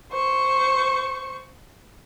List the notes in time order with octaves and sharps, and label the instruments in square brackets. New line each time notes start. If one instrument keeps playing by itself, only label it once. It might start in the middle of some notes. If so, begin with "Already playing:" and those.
[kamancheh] C5 C#6